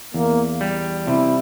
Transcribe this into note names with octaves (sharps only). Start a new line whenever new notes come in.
E2 A#3
G3
C3 E4